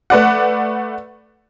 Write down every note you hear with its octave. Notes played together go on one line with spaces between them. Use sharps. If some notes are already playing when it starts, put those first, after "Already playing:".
A3 B4 D5 F#5